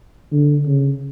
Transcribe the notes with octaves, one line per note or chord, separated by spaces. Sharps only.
D3
C#3